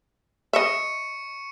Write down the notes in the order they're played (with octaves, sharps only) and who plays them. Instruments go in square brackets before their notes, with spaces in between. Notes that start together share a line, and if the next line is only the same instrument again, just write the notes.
[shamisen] D#5 E5 [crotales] C#6 C#7 D#7